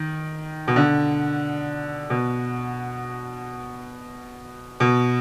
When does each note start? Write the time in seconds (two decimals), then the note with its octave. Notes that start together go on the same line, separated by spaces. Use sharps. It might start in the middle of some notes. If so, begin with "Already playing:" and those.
Already playing: D#3
0.68 B2
0.76 D3
2.10 B2
4.80 B2